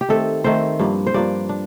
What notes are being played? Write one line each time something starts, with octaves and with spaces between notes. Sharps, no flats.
G4
D#3 A3 C4 A4
D#3 A3 C4 C5
G2 F3 A#3 D4
C5
G2 F3 A#3 D4 D5
D4